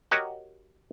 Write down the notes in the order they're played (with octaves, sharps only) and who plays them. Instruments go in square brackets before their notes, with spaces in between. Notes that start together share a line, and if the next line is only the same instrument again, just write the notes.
[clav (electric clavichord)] F#4 G4 A#4 C#5 D#5 F#5